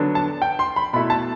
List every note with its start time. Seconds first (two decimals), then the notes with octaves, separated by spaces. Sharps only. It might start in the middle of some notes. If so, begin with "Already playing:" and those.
Already playing: D3 F#3 B3 D4
0.15 A5
0.42 G5
0.59 C6
0.76 B5
0.93 B2 A3 E4 B5
1.10 A5